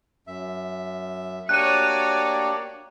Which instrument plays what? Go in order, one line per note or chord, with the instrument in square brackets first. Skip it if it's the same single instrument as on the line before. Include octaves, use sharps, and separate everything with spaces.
[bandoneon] F#2 E5
[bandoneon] A#3 D4 G4 [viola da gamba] F#4 C#5 D5 [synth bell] F#6 D#7